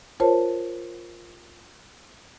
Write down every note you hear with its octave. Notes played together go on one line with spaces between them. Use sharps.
F4 A#4 C5 C#5 A5